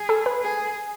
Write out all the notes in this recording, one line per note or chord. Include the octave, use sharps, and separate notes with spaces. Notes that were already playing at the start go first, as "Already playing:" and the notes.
Already playing: G#4
A4
B4
G#4